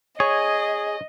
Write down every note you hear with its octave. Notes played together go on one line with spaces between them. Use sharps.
G#4 C#5 D#5